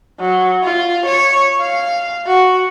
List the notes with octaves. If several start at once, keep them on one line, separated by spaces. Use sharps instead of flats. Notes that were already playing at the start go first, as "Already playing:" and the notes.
F#3
F4
C#5
F5
F#4